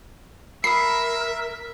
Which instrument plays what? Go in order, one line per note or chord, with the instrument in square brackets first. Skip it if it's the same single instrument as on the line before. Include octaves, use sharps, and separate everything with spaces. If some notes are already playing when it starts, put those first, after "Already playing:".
[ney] A#4 [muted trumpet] E5 [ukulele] B5 [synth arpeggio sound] D#6 C7